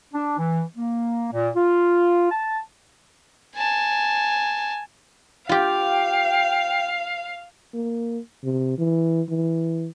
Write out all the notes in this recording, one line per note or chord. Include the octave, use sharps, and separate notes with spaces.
D4
E3
A#3
A#2
F4
A5
G#5 A5
F4 G4 F5 G5
A#3
C3
E3
E3